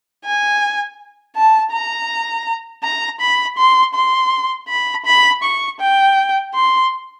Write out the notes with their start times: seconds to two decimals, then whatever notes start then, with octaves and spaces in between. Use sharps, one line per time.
0.24 G#5
1.36 A5
1.72 A#5
2.83 A#5
3.20 B5
3.57 C6
3.94 C6
4.68 B5
5.05 B5
5.43 C#6
5.80 G5
6.54 C6